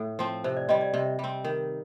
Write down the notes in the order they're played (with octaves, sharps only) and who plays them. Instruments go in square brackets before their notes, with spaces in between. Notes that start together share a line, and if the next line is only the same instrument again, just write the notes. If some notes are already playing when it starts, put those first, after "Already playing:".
Already playing: [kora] A2
F3 C4
[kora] C3 [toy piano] C5
[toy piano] D5
[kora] G3 C4 [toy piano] D#5
[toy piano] D5
[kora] C3
G3 C4
D#3